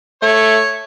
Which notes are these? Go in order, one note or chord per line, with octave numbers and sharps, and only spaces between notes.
A3 C#5